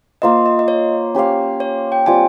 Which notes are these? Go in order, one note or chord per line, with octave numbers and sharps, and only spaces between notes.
A#3 F4 C5 D#5
D#5
D#5
C#5
C#4 G4 C5 F5
C#5
G5
G3 C4 F4 G#5